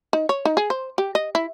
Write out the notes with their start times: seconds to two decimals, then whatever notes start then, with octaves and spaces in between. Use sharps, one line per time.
0.13 D#4
0.29 C#5
0.45 D#4
0.57 G#4
0.70 C5
0.98 G4
1.15 D#5
1.35 E4